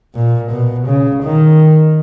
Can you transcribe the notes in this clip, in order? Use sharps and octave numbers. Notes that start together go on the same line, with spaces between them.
A#2
B2
C#3
D#3